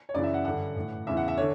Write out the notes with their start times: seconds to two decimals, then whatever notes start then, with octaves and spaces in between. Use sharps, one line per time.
0.09 C#5
0.14 F#2 C#3 E3 D5
0.24 E5
0.34 F#5
0.45 G2 D3 F#5
0.76 A2 E3
1.07 E2 C#3 E3 E5
1.17 F#5
1.28 E5
1.38 D3 C#5